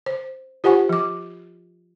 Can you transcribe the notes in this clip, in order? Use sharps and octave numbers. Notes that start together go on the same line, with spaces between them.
C5
F4 G4 C5 F#5 G#5 C#6
F3 D6